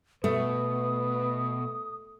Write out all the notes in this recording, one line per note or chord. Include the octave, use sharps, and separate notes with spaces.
B2 A3 B4 D#6